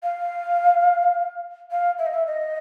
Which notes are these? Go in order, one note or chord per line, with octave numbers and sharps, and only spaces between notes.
F5
F5
E5
D#5
E5
D#5